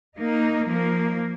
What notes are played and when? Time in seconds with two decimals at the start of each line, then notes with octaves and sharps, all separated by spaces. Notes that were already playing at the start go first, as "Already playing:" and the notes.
0.17 A#3 D#4
0.66 F3 A#3